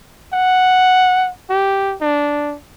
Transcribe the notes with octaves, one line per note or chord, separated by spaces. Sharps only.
F#5
G4
D4